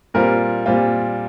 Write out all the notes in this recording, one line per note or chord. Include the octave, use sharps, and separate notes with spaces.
A#2 G3 C4 F4 A#4
A#2 G3 C4 F4